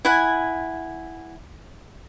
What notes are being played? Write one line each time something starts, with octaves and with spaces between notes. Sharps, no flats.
E4 F#5 G#5